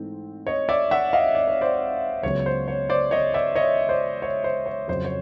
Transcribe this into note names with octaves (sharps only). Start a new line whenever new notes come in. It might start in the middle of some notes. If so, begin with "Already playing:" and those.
Already playing: G#2 E3 A3 C4
C#5 D#5
D5 E5
E5 F#5
D#5 F5
D5
C#5
C5 D5
C#2 C#3 F#3 B3 C#5
C5
C#5
C5 D5
C#5 D#5
D5 E5
C#5 D#5
C5 D5
C#5
C5
C#5
F2 C#3 F#3 C5
C#5